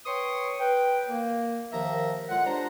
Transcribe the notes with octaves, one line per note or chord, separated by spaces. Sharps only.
B4 C#5 G5 C6 C#6 D#6
B4 G5
A#3
D#2 D#3 F3 E5 F5 A#5
A2 G#3 F4 F#5
D4 F4 G4 C5 A#5